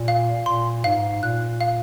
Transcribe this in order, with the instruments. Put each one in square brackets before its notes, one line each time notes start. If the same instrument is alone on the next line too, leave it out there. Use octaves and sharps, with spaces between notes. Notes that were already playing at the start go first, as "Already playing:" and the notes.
Already playing: [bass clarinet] A#2
[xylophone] F5
[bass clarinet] A#2 [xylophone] C6
[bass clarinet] G#2 [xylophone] F5
[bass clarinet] A#2 [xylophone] F#6
[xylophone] F5